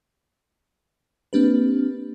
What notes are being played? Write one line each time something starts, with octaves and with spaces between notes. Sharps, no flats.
A#3 C4 D4 G4 B4